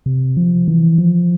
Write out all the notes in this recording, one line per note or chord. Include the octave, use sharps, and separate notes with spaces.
C3
F3
E3
F3